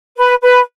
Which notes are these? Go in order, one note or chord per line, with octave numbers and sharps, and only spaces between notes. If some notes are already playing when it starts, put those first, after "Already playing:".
B4
B4